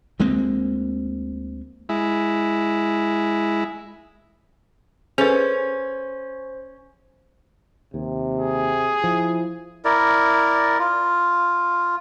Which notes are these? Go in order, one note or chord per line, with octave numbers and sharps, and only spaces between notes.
D2 G#3 A#3 C4
G#3 E4
C#4 G#4 A4 B4 C5
D#2 C3
G#4
F3 E4
E4 A#4 D5
F4